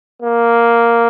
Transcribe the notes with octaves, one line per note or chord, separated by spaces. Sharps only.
A#3